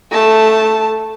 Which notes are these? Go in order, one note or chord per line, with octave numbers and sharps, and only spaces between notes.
A3 A5